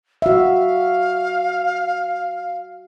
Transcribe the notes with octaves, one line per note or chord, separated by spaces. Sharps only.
F#4 E5 F5